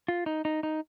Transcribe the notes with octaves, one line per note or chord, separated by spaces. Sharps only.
F4
D#4
D#4
D#4